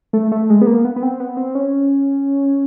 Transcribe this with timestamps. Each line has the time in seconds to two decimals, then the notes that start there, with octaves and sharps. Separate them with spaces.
0.13 A3
0.32 A3
0.50 G#3
0.61 B3
0.66 A#3
0.85 B3
0.96 B3
1.02 C4
1.20 B3
1.37 C4
1.55 C#4